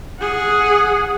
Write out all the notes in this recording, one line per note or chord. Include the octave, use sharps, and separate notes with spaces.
G#4 F#5